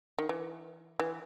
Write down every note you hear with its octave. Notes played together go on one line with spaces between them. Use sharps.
D#3
E3
E3